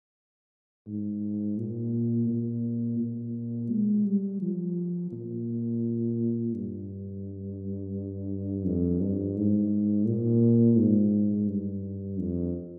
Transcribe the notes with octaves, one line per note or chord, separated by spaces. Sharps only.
G#2
A#2
A#2
A#2
G#3
G3
F3
A#2
G2
F2
G2
G#2
A#2
G#2
G2
F2